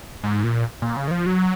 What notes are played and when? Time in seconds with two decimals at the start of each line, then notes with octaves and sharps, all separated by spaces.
0.23 G#2
0.44 A#2
0.82 A#2
0.97 C#3
1.08 D#3
1.11 F3
1.26 F#3